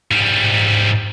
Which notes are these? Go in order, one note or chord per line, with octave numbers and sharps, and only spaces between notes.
G#2 G3